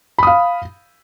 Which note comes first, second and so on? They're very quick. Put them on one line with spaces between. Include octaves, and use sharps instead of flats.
B5 D#6 F5